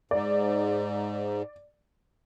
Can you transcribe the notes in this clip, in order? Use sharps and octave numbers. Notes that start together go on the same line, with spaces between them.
G#2 D5